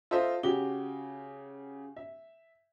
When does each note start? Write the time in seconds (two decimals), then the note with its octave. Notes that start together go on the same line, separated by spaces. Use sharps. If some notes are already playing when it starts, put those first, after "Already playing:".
0.11 F4 A4 C5 D#5 E5
0.43 C#3 F#4 G4 G7
1.96 E5